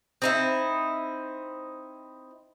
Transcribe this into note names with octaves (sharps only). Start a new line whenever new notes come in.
C4 D#4 E4